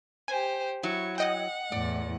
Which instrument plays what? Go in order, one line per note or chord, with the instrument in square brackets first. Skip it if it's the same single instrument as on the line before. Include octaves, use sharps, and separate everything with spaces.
[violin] G4 C5 [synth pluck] G#5
[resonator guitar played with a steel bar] F#3 E4 [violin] C#6
[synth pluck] D#5 G5 [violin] F#5
[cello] E2 A2 [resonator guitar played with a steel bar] D5